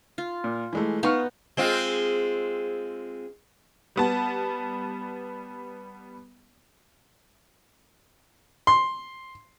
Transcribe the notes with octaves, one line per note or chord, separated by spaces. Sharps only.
F4
A#2
E3 G#3 A3
B3 D#4 F5 C#6 F6
G#3 C4 F4
G3 B3 A5
C6